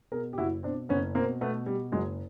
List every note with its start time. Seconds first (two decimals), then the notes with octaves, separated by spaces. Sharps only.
0.12 B2 G#4 A#4
0.33 G4
0.38 F#1 E4 F#4
0.63 B2 C4 D4
0.89 F#1 B3 C#4
1.15 B2 A#3 C4
1.41 B2 A3 B3
1.66 B2 G3
1.92 F#1 F#3 G#3